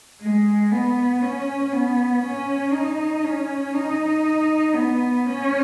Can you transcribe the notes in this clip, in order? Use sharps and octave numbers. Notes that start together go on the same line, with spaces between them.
G#3
B3
C#4
B3
C#4
D#4
C#4
D#4
B3
C#4